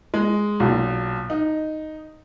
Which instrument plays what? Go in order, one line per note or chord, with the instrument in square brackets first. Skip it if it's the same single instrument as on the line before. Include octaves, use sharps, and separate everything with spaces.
[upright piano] G#3
B1 A#2
D#4